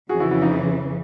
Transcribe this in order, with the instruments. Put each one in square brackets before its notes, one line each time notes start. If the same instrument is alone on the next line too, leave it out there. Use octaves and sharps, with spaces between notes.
[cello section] F2 C#3 E3 [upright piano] F#4 G#4
[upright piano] E4 F#4
E4 F#4
D#4 F4